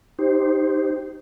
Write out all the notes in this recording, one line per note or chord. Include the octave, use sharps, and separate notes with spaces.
D#4 G4 C5